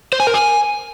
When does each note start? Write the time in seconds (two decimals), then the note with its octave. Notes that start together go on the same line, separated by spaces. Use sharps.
0.13 C5
0.20 G#5
0.27 A#4
0.34 G#5